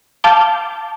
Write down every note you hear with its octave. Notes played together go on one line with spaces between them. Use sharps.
F5 A5 D6 G6